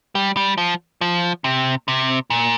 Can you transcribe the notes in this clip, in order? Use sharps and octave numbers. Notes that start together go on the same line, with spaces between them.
G3
G3
F3
F3
C3
C3
A#2